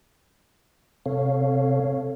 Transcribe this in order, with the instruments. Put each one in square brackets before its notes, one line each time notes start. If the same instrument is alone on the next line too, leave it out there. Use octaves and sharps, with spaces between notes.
[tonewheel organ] C3 C4 A4 C#5 F5